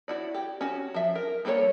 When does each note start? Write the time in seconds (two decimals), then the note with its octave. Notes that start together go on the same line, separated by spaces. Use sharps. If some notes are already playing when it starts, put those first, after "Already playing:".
0.08 E4 F#4 D5
0.34 G4
0.61 C#4 F#4
0.94 F3 E5
1.15 A#4
1.45 G3 A#3 A4 A#4 C#5